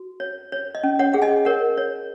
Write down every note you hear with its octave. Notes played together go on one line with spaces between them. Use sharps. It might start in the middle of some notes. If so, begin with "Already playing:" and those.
Already playing: F#4
C#5
C#5
D#5
C#4
C#5 F#5
G#4 F#5
D#5 G#5
A#4 C#5 F#5
C#5